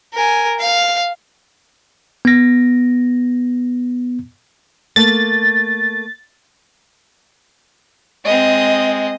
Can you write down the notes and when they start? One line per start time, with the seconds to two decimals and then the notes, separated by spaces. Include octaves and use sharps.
0.13 A#4 G#5
0.59 F5
2.25 B3 A#6
4.96 A3 A#3 A6
8.25 G#3 C4 D#5